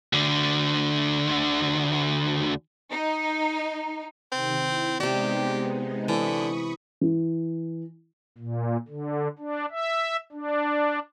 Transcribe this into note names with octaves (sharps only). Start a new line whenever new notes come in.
D2 D3
D#4
C3 D#3 C4
E4
C3 G#3 B3 D#4 G4 D5
D3 E3 B5 C#6 D#6
E3
A#2
D3
D4
E5
D4